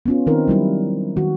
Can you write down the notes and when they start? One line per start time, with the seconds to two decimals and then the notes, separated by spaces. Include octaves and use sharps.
0.06 B3 C#4 F4
0.27 D#3 C4 D#4 A#4
0.48 F#3 G3 E4
1.17 D#3 F#4